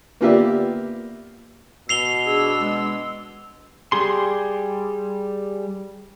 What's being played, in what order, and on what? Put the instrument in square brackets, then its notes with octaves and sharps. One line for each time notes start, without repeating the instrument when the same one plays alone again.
[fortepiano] A#3 B3 F4 G4 D5 E5
[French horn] B2 [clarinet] E6 [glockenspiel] C7 F7 G7
[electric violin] D4 E6 [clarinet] G#4
[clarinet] G#3
[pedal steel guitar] G3 G4 G#4 C6